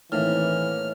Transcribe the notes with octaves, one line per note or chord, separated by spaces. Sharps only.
A2 D#3 E3 A#3 C4 F6